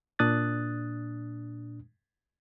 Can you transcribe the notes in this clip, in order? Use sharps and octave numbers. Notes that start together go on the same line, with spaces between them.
A#2 D4 D#6 F#6 A6